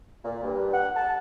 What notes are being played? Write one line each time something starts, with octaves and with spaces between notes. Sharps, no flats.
A#2
G2
F#5
A5